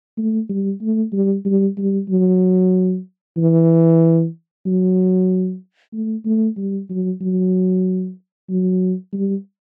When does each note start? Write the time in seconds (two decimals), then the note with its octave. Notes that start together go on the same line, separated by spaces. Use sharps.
0.18 A3
0.49 G3
0.82 A3
1.13 G3
1.45 G3
1.78 G3
2.09 F#3
3.37 E3
4.66 F#3
5.93 A3
6.25 A3
6.57 G3
6.90 F#3
7.21 F#3
8.49 F#3
9.13 G3